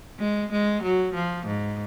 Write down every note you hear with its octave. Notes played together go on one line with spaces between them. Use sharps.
G#3
G#3
F#3
F3
G#2